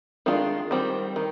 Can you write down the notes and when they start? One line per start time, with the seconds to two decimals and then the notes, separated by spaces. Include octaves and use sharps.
0.26 D#3 G#3 D4 F4
0.71 D#3 G3 C4
1.16 D#3